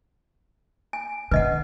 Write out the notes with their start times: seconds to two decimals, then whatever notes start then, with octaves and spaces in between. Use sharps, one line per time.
0.93 G#5
1.31 D3 B4 D#5 F#5